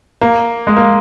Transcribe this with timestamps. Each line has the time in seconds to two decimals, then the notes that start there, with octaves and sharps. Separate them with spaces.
0.21 A#3
0.67 G#3
0.77 A#3